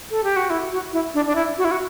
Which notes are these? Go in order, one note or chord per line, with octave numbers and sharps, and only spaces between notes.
A4
G4
F#4
E4
F#4
E4
D4
D4
E4
F#4
E4
F#4